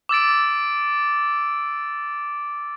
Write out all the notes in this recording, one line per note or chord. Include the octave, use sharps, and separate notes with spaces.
D6 E6 A6 D7